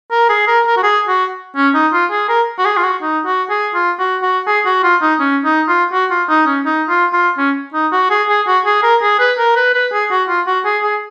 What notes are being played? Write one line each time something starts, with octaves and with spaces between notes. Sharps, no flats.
A#4
G#4
A#4
A#4
F#4
G#4
F#4
C#4
D#4
F4
G#4
A#4
F#4
G#4
F4
F#4
D#4
F#4
G#4
F4
F#4
F#4
G#4
F#4
F4
D#4
C#4
D#4
F4
F#4
F4
D#4
C#4
D#4
F4
F4
C#4
D#4
F#4
G#4
G#4
F#4
G#4
A#4
G#4
B4
A#4
B4
B4
G#4
F#4
F4
F#4
G#4
G#4